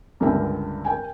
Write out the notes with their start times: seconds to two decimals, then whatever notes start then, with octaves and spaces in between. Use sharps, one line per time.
0.20 C#2 G2 D3 A#4 E5 G5
0.85 A#4 G5 G#5